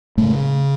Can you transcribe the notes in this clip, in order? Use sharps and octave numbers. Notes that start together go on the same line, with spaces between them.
A2 C#3 A3